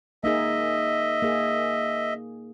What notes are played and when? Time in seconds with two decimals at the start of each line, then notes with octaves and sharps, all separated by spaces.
0.24 A#3 D#4 G#4 D#5 E5
1.22 A#3 G#4